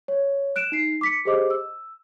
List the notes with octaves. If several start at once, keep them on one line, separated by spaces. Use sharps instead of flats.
C#5
F#6 D7 E7
D#4 C7
D6 B6 C#7
G4 G#4 C5 D#5 D6
E6